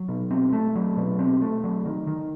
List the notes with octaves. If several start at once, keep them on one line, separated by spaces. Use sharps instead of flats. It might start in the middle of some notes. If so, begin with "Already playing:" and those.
Already playing: F#3
B2
C4
A3
F#3
B2
C4
A3
F#3
D#3
D#3